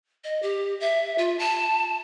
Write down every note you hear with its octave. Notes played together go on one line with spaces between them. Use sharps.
D#5
G4
E5
F4
A5